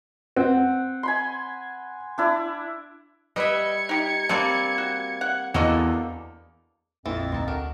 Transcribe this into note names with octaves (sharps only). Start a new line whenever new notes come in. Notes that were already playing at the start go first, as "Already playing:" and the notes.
C4 F#5
G#5 B5 C6
D4 E4 D5
G3 B4 D#5 E5 G#6 C#7
D#4 G4
G3 A#3 C4 D4 A5
F#4
F#5
E2 A#3 D4 F#4 A4 D#5
A#1 F2 E3 C4 E4 A6
D2 C4 D#4
D4 F#4 A#4